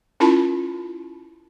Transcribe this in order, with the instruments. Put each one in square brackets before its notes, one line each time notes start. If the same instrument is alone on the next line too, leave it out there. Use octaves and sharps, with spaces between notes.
[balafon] C#4 E4 F4 A#4 A5 B5